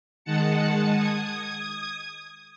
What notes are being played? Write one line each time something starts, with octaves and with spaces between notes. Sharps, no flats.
D#3 G#3 D#4 F#5 A5 C#7
D#6 G#6